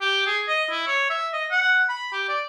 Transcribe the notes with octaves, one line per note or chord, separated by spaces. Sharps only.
G4
G#4
D#5
E4
C#5
E5
D#5
F#5
B5
G4
D5